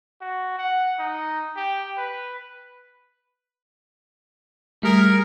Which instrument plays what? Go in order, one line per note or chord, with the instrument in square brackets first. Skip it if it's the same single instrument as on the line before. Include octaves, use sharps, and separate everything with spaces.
[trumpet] F#4
F#5
D#4
G4
B4
[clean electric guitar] G3 [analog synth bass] A3 [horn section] G#4 A#4